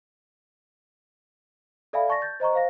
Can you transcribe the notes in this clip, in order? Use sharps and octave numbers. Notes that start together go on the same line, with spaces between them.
A4 D5 E5 F5 G#5 B5
D5 A5 C#6 A6 A#6
G6 A6
C5 D#5 A#5 C#6
C5 F5 A#6